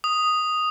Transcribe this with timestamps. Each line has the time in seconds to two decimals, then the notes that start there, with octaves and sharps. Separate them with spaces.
0.04 D#6